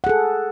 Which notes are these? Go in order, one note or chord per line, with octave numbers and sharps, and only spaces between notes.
G#4 A4 F#5